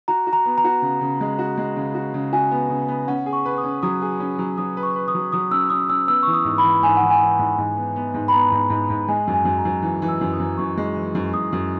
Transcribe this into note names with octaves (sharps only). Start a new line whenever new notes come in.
F#4 A#5
F#4
A#5
B3
A#5
F#4
C#3
C#3
G#3
F#4
G#3
C#3
F#4
C#3
F#4 G#5
B3
C#3
B3
C#4 F#5
G#4
C#6
B4
D#6
C#4
F#3 D#6
G#4
C#4
F#3
F#3 D#6
B4
C#6
B4
D#6
F#3
F#3 D#6
C#4 E6
C#4 D#6
C#4 E6
B3 E6
E3 C#6
D#6
G#2
B5
E3
G#2 G#5
E3 F#5
G#5
E3
G#2
G#2
B3
B3
G#2
B5
B3 A#5
G#2
G#2
G#2
G#3 G#5
F#2
G#5
F#2
A#5
F#2
E3
E3
E6
F#2
D#6
F#2
F#2 C#6
G#3
E3
F#2
F#2 D#6
F#2